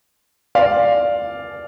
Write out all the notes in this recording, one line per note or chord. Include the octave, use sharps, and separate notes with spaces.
D5 F5